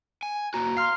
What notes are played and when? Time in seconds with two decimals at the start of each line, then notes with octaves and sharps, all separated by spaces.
0.23 G#5
0.54 A#3 F#4 A#5
0.77 F5 C6 F6 C7